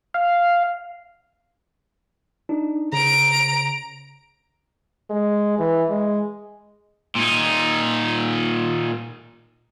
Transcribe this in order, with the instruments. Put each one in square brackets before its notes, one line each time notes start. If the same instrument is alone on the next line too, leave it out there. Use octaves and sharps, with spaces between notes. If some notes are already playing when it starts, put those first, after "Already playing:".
[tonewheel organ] F5
[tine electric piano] D4 D#4
[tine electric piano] C#3 [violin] A#5 D7
[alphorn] G#3
E3
G#3
[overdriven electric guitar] A#2 D#4